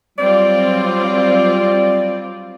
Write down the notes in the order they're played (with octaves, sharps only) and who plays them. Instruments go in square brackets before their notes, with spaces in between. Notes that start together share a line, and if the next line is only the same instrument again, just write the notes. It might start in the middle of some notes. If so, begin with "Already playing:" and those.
[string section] F#3 C4 F4 [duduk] G3 [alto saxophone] D5